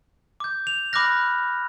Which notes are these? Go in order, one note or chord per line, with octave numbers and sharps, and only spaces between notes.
D6 G6
F7
B5 D6 F6 F#6 A#6